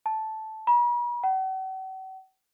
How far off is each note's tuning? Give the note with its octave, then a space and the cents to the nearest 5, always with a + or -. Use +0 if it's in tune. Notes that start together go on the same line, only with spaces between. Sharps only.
A5 -10
B5 -45
F#5 +45